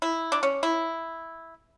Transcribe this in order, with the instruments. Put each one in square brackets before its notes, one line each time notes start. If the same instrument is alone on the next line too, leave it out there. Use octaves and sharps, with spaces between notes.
[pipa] E4
D4
C#4
E4